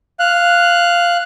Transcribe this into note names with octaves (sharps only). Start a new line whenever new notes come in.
F5 F#6